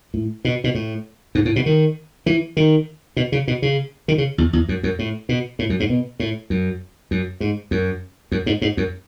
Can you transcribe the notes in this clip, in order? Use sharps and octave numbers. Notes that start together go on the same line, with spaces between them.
A2
B2
B2
A2
G#2
A2
B2
D#3
E3
D#3
B2
C#3
B2
C#3
D#3
C#3
E2
E2
F#2
F#2
A2
B2
A2
F#2
G#2
B2
A2
F#2
F#2
G#2
F#2
F#2
G#2
G#2
F#2